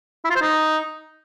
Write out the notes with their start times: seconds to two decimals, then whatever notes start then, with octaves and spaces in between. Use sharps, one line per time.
0.24 E4
0.30 F4
0.36 C5
0.41 D#4